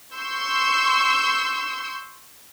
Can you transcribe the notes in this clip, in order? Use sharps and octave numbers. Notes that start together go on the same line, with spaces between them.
C6 C#6 E6 G6